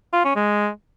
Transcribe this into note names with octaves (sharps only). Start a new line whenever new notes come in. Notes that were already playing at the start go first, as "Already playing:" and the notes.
F4
C#4
G#3